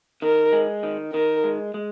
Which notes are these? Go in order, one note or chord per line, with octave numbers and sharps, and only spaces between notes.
D#3 A#4
G#3
D#3
D#3 A#4
G#3
G#3